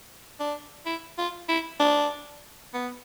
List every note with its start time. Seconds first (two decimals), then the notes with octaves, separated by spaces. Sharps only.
0.40 D4
0.86 E4
1.18 F4
1.49 E4
1.80 D4
2.74 B3